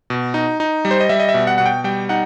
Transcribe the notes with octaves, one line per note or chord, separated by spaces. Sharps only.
B2
D#4
D#4
G3
C5
D#5
G3 E5
D#5
E5
B2
F#5
B2 F#5
G5
G3 G5
D#4 F#5